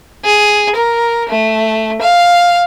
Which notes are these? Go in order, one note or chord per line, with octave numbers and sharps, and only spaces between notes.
G#4
A#4
A3
F5